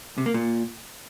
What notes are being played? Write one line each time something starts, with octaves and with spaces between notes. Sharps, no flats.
C3
A#3
A#2